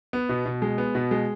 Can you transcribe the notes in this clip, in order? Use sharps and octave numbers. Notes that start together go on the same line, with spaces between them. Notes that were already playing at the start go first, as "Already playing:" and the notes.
B3
B2
B2
G#3
B3
B2
G#3